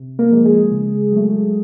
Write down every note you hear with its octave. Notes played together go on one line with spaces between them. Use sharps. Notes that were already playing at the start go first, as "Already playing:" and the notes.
Already playing: C3
A#3 A#4
F3 G#3
G#3 G#4
C#3
F#3 A3